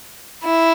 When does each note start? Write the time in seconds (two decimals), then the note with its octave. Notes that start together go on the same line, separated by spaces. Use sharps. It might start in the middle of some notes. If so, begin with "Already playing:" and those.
0.44 E4